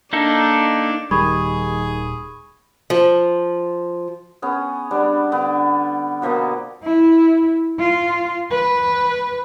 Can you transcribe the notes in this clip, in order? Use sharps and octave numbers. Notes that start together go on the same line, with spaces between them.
A#3 D4 D#4 A4
D#1 D#3 G3 G#4 B5 C#6 G#6
F3
B3 C#4 G#4
G3 B3 D4
D3 B3 D5
B2 F3 A#3 B3
E4
F4
B4